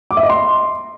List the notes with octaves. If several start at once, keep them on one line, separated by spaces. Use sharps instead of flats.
D6
E5
D#5
C6